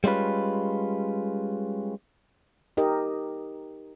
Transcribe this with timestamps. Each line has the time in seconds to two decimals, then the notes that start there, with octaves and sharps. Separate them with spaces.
0.04 G3 G#3 C#4 F4 B4
2.77 D#4 G4 A#4 D#5